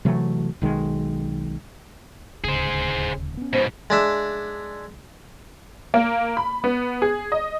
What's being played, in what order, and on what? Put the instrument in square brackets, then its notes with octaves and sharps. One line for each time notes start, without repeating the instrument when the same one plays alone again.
[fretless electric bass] C3 E3 F#3 A3
B1 D#3 G#3
[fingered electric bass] D#1 D2 C#3 [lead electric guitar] G#4 C5
[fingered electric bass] B3 C#4
[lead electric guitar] G#2 B2 [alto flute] C5
[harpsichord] G#3 D4 E5
[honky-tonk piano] A#3
B5
B3
G#4
D#5